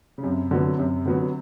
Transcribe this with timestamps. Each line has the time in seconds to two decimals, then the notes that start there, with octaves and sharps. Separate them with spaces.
0.18 C#3
0.23 F#2 C3
0.51 D3 F#3 B3
0.78 F#2 C3
1.05 D3 F#3 B3